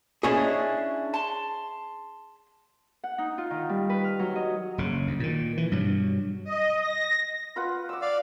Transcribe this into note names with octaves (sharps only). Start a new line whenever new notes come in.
C#4 D4 E4 G#4 C#5 D#5
A5 C6
F#5
D#4
F4
D#3
G3
B4
F6
F#3
D#5
F#1 C#3
D2
A#2 D#3
E3
G2 B2 F#3
D#5
A#6
F4 B4 F#5
D6 E6
D5 F5